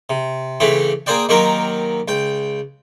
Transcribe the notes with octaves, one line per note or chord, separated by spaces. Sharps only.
C3
C#3 E3 A3 C4 G4
A#3 G#4 C5 D5 G5
D#3 F#3 A#3 C4 G4 A#4
C#2 G5